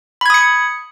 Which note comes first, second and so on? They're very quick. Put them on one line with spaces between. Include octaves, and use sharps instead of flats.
B5 G#6 D#6 C#7